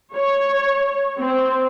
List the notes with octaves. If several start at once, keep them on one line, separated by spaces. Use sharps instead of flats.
C#5
C4